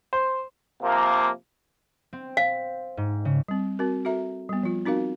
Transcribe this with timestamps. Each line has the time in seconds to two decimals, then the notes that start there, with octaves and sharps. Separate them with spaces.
0.13 C5
0.83 C3 F3 A#3
2.13 C4
2.37 F5
2.97 G#2
3.25 C#3
3.48 G3 C4
3.79 C4 F#4 A#4
4.05 F#4 A4 E5 A#5
4.49 G3 B3
4.63 F3 F4
4.86 C4 D#4 F#4 A#4 F5